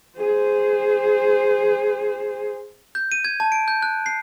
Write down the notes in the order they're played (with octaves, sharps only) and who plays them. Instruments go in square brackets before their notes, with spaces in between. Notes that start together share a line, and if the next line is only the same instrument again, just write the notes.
[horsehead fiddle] G#4 C5
[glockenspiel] G6
D#7
G#6
A5
D7
G6
F#6
C7